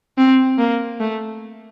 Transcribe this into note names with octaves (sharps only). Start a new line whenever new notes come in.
C4
A#3
A3